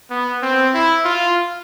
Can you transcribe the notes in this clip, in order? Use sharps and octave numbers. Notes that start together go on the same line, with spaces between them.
B3
C4
E4
F4